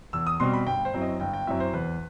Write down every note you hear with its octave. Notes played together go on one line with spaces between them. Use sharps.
E2 E6
D#6
B2 G3 C4 C6
B5
G1 G5
C5
F#2 F#3 C4 E4
D#5
G1 G5
G5
F#2 F#3 C4 E4 E5
C5
E2 B4